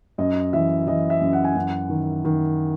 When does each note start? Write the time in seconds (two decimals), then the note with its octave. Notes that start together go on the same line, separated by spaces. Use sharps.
0.18 F#2 D#5
0.53 E3 E5
0.87 E3 D#5
1.10 E5
1.21 F#2
1.33 F#5
1.44 G#5
1.56 F#2 F#5
1.89 D#3
2.25 D#3